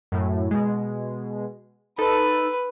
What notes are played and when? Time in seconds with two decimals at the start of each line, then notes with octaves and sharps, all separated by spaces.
0.12 F#2 A2
0.51 B2 G#3
1.98 D#4 A4 B4